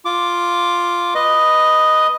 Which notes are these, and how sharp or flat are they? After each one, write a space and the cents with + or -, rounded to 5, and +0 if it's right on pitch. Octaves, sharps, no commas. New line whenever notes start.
F4 +0 D6 +0
B4 +0 D#5 +0